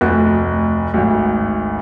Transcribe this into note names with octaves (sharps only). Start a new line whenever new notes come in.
F1 D2 F#6
G#1 D2